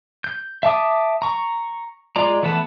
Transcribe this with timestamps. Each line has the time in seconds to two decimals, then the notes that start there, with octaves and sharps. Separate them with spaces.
0.24 G6
0.63 E5 A5 D6 D#6
1.22 A#5 C#6
2.16 G#3 F4 D5 A#5
2.43 E3 A3 B3 B4 A5